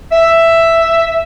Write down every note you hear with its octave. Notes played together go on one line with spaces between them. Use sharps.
E5